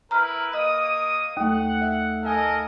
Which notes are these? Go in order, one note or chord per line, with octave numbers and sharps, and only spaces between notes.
E4 A#4 B4 A#5 F6
A#3 D#5 D#6
D#2 A3 F#5 D#6
E5
A4 A#4 D#5 F5 G#5